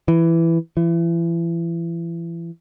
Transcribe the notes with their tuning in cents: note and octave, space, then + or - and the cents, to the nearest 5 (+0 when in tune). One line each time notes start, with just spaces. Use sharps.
E3 +10
E3 +30